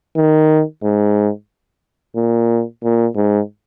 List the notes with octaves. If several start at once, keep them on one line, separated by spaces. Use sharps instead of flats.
D#3
G#2
A#2
A#2
G#2